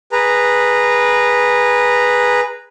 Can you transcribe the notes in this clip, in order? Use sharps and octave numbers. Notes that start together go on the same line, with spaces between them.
G#4 B4 A#5